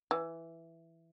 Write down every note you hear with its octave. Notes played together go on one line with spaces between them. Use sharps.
E3